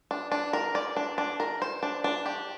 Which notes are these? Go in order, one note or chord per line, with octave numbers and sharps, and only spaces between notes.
D4
D4
A#4
D5
D4
D4
A#4
C5
D4
D4
G4